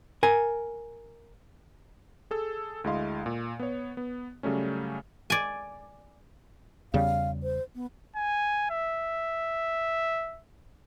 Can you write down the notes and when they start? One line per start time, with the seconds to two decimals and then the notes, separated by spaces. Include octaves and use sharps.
0.23 A#4 G#5
2.31 G#4 A4 E6
2.84 D2 G#3 E4 D#5 F5 C6
3.26 A#2
3.60 B3 C#5
3.97 B3
4.43 C#3 F#3 G3 A3 C#4
5.30 D5 G#5
6.94 E2 C#3 G3 F5
7.43 C5
7.75 B3
8.16 G#5
8.71 E5